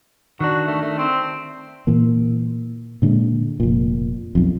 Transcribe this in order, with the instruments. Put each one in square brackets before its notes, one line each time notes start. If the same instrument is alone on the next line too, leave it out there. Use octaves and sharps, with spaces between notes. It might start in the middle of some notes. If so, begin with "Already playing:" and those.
[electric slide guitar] D#3 D4 [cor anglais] F#4
[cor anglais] A3
A3
C4
[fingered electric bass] A#2 E3 A#3
A#2 D3 G#3
F1 A#2
B1 F2